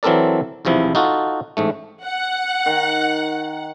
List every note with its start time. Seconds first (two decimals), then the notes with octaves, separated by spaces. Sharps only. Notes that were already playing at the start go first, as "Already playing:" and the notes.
0.03 E3 F#3 C4 A4 A#4 D5
0.65 B1 E2 C3 F3 E4
0.95 D#4 F4 F#4 A4
1.57 A1 G#2 A3
2.03 F#5
2.66 D#3